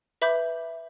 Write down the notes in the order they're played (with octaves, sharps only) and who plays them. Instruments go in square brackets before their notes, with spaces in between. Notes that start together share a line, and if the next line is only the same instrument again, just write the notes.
[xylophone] B4 E5 B5 D6 G6